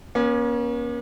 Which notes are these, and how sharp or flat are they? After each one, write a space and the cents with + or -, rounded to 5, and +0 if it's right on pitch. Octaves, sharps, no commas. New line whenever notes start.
A#3 +45 C#4 +0